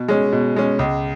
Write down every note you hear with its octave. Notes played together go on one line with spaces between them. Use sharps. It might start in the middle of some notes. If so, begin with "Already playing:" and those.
Already playing: B2
G#3 C#4
B2
G#3 C#4
C#2